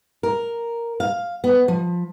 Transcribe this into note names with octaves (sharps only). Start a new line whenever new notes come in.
A#4
F5
B3
F3